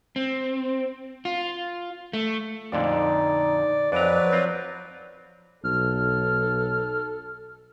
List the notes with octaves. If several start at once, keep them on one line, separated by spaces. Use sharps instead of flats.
C4
F4
A3
F2 A#2 D3 D#4 D5
F2 F3 F#3 B4 D5 A#5
C4 F4
B1 A4 F6